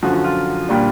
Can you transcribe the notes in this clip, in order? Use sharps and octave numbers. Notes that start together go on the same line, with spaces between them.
F#2 D3 F3 F#4
F#4
F4
A#2 G3 A#3 D4